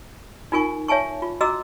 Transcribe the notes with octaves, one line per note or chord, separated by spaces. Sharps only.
D#4 F4 A#4 G#5 C#6
C#5 E5 G#5 A5 C#6
F4
F#4 D#5 A#5 D6 E6